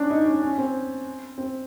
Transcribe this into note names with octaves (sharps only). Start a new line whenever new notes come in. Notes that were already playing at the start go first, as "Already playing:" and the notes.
Already playing: C#4 D4
D#4
C#4
C#4
C4
C4